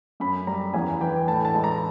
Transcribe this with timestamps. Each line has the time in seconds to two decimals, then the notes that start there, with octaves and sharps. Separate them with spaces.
0.20 F#2 B5
0.47 G3 A#5
0.74 E2 G#5
1.01 E3 G5
1.27 A2 A5
1.45 A5
1.54 G#3
1.64 A#5